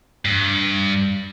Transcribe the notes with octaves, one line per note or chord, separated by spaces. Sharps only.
G2